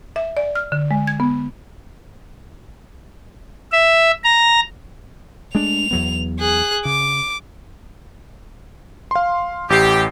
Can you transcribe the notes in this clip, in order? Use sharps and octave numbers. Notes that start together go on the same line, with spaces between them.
E5
D5
F6
D3
G#3
G#6
B3
E5
A#5
G#3 A3 D4 F7
E2 F#3 B3
G#4 F#6
C#3 D6
F5 C6
A1 G4 C7